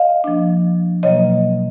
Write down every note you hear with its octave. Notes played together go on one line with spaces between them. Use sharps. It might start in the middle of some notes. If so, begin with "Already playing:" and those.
Already playing: D#5 F5
F3 A#3 D4
B2 F#3 A#3 C#5 D#5